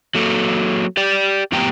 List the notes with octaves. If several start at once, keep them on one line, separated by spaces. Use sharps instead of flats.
F#3 A#3 A4
G4 D5
F2 A2 B3 G4 G5 A#5